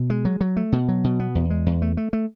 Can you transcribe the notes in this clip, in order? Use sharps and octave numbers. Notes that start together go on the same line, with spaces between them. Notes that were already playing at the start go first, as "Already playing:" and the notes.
Already playing: B2
G#3
F#3
F#3
A3
B2
F#3
B2
B3
E2
G#3
E2
A3
A3
A3